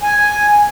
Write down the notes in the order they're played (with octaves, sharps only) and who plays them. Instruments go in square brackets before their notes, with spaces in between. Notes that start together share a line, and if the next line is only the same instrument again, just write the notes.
[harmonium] G#5